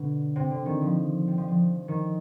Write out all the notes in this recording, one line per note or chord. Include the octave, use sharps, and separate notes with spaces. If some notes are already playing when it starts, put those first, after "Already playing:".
Already playing: B2 D3
C3
D3
D#3
F3
G3
F3
F3
D#3